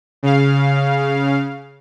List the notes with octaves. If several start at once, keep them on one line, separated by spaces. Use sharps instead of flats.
C#3 F5